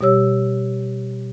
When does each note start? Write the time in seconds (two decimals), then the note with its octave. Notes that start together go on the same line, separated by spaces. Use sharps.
0.01 B2 G3 G4 C#5 E6